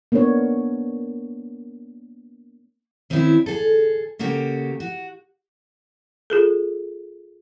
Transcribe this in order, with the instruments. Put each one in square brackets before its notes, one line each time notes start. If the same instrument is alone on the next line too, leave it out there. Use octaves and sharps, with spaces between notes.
[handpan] A#3 B3 D4 A#4 C#5
[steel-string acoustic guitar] D#3 C4 C#4 D#4 E4
G#4 A4
C#3 A#3 F#4 G4 A4
F#4
[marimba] F4 G#4 A4